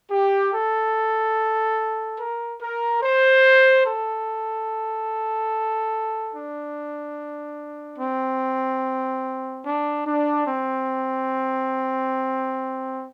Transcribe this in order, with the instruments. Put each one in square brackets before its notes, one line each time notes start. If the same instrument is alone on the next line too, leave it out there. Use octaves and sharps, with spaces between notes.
[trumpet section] G4
A4
A#4
A#4
C5
A4
D4
C4
D4
D4
C4